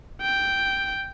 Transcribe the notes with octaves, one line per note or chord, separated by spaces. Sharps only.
G5